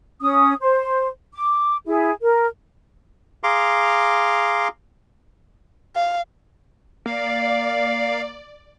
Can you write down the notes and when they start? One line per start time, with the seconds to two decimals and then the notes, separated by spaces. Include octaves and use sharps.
0.21 C#4 D#6
0.61 C5
1.34 D6
1.86 E4 G#4
2.22 A#4
3.44 G#4 F5 A#5 C6 D6
5.96 F5
7.06 A#3 D5 F5